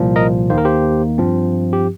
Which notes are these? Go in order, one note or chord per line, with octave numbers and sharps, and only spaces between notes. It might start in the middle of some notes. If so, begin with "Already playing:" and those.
Already playing: C2 A#2 F3 A#3
A#4 D#5
D#2 D#3 A#3 C5
A#4
G4 C5
G2 F3 C4
G4